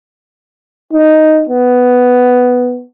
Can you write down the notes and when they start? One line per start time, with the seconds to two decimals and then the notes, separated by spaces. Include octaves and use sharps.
0.93 D#4
1.49 B3